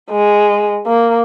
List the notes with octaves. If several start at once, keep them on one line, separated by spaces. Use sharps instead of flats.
G#3
A#3